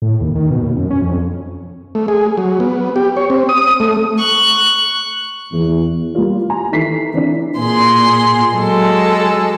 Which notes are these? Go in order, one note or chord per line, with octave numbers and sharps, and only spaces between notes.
A2
D#2
D#3
B2
D#2
F#2
C#4
F2
A3
G#4
F#3
B3
G4
C#5
C4
D#6
A3
C#6 F#6
E2
G3 A#3 F4
G#5 A#5
D#3 E3 E4 A4 B6 C7
E3 C4 D4 E4
A#2 G#4 C6
F#3 G#3 A4